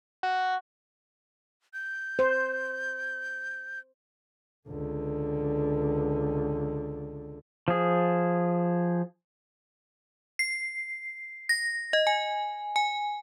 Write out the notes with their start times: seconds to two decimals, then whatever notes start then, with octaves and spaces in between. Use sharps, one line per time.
0.23 F#4
1.74 G6
2.19 C5
4.69 C#2 D3
7.68 F3 G#4
10.39 C7
11.49 A#6
11.93 D#5
12.07 G#5
12.76 G#5